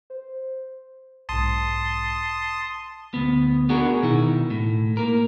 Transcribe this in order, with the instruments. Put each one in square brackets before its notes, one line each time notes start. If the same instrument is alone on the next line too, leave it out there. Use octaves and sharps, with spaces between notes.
[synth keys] C5
[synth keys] B1 G#2 [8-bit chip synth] A5 C6 D#6
[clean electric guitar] D2 B3
B3 D4 F#4 G#4 A#4
B2 D#3 E4
A2
A#3 A#4